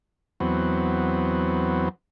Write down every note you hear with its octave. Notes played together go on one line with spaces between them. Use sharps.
E2 F#3 B3 C4